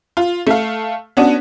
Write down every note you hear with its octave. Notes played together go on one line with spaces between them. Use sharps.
F4
A3 F5
B3 C#4 D4 F#4